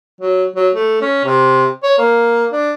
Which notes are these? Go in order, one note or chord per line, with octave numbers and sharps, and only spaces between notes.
F#3
F#3
A3
C#4
C3
C#5
A#3
D4